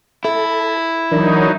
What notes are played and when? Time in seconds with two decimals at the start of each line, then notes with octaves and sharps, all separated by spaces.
0.24 E4 A4
1.12 E3 F#3 D4 D#4 A#4